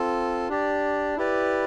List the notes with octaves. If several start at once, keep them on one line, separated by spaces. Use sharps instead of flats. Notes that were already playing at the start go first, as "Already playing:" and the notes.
Already playing: C4 F4 A4
D4 G4 D5
E4 G4 B4 D5